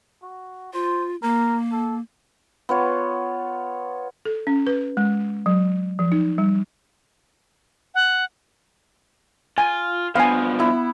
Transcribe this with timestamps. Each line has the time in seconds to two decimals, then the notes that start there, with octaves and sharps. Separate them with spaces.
0.23 F#4
0.73 F4 C5
1.22 A#3 A#4
1.72 A4
2.69 B3 F4 C#5
4.25 A4
4.47 C#4
4.67 B4
4.97 G#3
5.46 F#3
5.99 F3
6.12 D#4
6.38 G3
7.95 F#5
9.58 F4 G#5
10.15 G2 F3 B3 F5 G#5
10.59 B3 E4